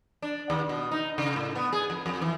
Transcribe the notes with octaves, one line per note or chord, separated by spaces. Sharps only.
D4
D#2
B2
D#4
C#3
A2
B3
G#4
F2
F2
E3